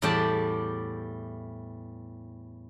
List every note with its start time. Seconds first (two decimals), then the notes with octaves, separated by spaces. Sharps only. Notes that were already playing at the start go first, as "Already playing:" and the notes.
0.02 E2 A2 G3 G4 D5 A5